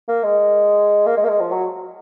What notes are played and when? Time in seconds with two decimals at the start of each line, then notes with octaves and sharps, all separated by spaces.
0.08 A#3
0.24 G#3
1.06 A#3
1.17 G#3
1.24 A#3
1.28 G#3
1.40 F3
1.52 F#3